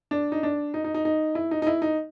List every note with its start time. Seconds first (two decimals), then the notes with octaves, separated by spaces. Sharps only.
0.11 D4
0.32 D#4
0.43 D4
0.74 D#4
0.84 D#4
0.94 D#4
1.05 D#4
1.35 E4
1.51 D#4
1.62 D#4
1.67 E4
1.82 D#4